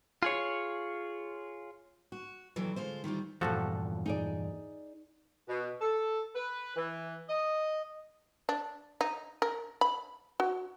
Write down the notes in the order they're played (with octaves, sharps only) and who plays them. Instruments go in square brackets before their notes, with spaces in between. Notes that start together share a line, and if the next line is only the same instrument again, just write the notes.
[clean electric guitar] F4 G#4 C#5
[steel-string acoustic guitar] F#4
F2 A#2 D3 E3 F#3
D3 G#3 F4 C5
D#3 E3 G3 F4
[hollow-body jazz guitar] E2 G2 A#2 [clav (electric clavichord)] F3 F#4 A4
[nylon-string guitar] D#4 G#4 D5
[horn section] B2
A4
B4
E3
D#5
[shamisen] D4
D#4
A#4
B5
F#4